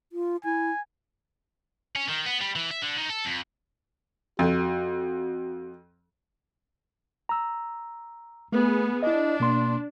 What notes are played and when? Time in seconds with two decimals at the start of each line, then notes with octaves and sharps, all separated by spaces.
0.12 F4
0.45 E4 G#5
1.96 C#4
2.09 D#3
2.26 B3
2.41 G3
2.56 E3
2.71 E5
2.82 D3
2.97 D#3
3.10 A4
3.25 F2
4.39 F2 F#4
7.29 A#5 E6
8.52 A3 B3 G#4
9.03 D4 E4 D#5
9.40 B2 A#3 C6